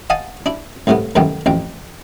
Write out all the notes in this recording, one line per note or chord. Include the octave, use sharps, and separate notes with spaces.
D#5 F5 F#5 G#5 A5
D4 E4
C2 A2 C3 A3 B3
C2 F#2 D#3 A3 B3 G5
A1 F2 G5